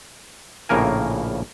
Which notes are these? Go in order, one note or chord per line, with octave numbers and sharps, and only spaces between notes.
A#1 A2 C#3 A#3 A#4 G#5